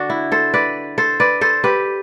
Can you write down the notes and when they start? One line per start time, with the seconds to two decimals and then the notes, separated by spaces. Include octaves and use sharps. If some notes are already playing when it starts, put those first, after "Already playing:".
Already playing: D3 D4 F#4
0.10 E4
0.32 A4 C5
0.54 B4 D5
0.98 A4 C5
1.20 B4 D5
1.41 A4 C5
1.64 G4 B4